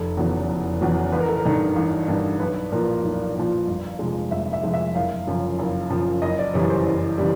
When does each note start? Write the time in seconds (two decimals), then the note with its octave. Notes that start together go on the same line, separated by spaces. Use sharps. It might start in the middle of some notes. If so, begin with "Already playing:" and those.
Already playing: F1 A4
0.17 E2 C#3 F#3 B3
0.49 F1
0.81 E2 C#3 F#3 B3
1.12 A1 B4
1.20 A#4
1.29 A4
1.36 A#4
1.45 G2 D#3
1.76 A1
2.08 G2 D#3
2.40 B1 B4
2.72 A#2 F3 A#4
3.04 B1
3.35 A#2 F3
3.68 G1
3.99 F2 C3 F3 G#3
4.31 G1 E5
4.53 E5
4.63 F2 C3 F3 G#3
4.74 E5
4.95 F#1 F5
5.27 F#2 C#3 F3
5.59 F#1
5.90 F#2 C#3 F3
6.22 F#1 D#5
6.39 D5
6.54 F#2 C#3 E3 G3 C#5
6.70 C5
6.86 F#1
7.18 C#3 E3 G3